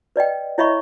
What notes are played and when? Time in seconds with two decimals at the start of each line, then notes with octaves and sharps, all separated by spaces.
0.16 B4 D5 D#5 G5
0.58 E4 C#5 D#5 E5 B5 C#6